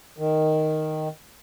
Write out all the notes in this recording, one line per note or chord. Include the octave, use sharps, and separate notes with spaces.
D#3